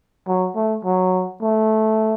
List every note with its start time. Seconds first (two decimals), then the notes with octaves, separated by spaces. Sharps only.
0.27 F#3
0.55 A3
0.84 F#3
1.42 A3